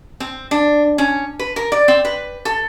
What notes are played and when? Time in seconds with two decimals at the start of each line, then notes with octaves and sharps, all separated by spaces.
0.20 C4
0.51 D4
0.98 C#4
1.39 B4
1.56 A#4
1.72 D5
1.88 C4
2.05 B4
2.45 A4